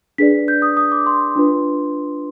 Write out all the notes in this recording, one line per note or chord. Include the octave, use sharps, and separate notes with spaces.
D4 G#4 B4 D5 B6
G6
D#6
D#6
D6
C6
D4 F4 B4